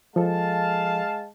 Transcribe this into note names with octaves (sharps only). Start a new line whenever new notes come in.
F3 G#3 A4 F5 A5